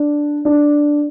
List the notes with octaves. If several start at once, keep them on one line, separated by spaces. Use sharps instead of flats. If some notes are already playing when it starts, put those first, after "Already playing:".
Already playing: D4
D4